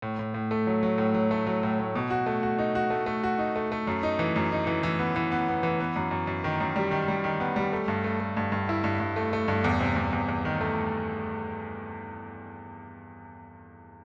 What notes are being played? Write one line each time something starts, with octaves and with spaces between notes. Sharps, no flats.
A2
A2
A2
A3
F#3
F#3
A2
F#3
A3
F#3
A2
A2
B2
F#4
A3
F#4
D#4
F#4
A3
A3
F#4
D#4
A3
A3
F#2
D#4
E3
F#2
D#4
E3
E3
B3
E3
B3
B3
E3
B3
F#2
F#2
F#2
D#3
F#2
G3
D#3
G3
D#3
B3
G3
A3
G2
A3
A3
G2
G2
E4
G2
G2
A3
A3
G2
E2
C3
E2
E2
E2
D#3
A3